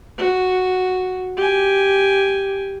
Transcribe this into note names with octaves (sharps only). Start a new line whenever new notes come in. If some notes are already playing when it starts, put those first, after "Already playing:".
F#4
G4 G#5